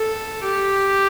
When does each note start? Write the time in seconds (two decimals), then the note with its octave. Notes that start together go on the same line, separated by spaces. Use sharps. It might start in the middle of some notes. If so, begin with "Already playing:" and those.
Already playing: A4
0.43 G4